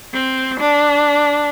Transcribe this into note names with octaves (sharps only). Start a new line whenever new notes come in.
C4
D4